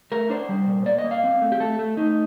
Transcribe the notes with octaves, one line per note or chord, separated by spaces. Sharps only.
A3 A#4
D4 C5
G3
A#2
A#3 D5
D#5
A#3
F5
C4
A3
G4
A3 A4
A3
A3 D#4